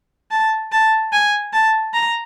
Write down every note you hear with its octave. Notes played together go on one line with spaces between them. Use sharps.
A5
A5
G#5
A5
A#5